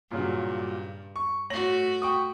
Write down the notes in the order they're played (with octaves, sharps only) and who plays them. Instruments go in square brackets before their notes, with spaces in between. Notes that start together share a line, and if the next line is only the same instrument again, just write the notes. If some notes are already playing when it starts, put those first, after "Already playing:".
[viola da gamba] G2 [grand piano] A#2 C#3 F#3
[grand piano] C#6
[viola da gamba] A3 F#4 [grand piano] C#5 A#6 F#7
[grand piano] G5 C#6 D#6